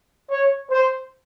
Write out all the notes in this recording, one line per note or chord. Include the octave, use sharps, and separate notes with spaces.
C#5
C5